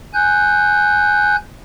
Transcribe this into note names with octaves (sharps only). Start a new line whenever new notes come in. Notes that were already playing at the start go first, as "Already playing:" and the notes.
G#5 F#6 G6